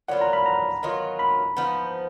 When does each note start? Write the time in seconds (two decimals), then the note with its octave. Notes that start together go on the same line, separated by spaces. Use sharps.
0.08 A#2 F#3 B3 F4 F#5
0.21 A#5
0.33 B5
0.46 A#5
0.83 D#3 F#3 B3 F4
1.19 B5
1.57 F3 B3 D#4